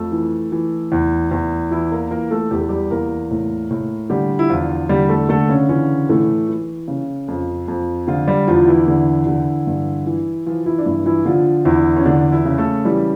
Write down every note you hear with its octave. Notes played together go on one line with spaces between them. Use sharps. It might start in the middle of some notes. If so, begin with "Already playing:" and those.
Already playing: F2 A3 A4
E3
E3
E2
E2
E3 E4
A#3 A#4
E3 A#3 A#4
A3 A4
E2 G4
A4
G3 G4
E2 A#3 A#4
A2
A2
D3 G3 G4
E4
E2 F3 F4
D3 G3 G4
A3 A4
D3 A3 A4
C#3 C#4
C#3 E3 C#4
A2 E3 A3
E3
C#3
F2
F2
D3 F3 F4
G3 G4
E2 F3 F4
E3 E4
D3
D3
G2
E3
E3 F3 F4
E3 E4
D4
G2 E3 E4
E3 E4
D3 F3 F4
E2 E3 E4
C#4
D3 E3 D4
E3 E4
C#3
A3 A4
E3 G3 G4